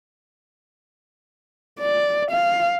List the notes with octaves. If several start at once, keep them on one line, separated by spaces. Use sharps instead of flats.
D5
F5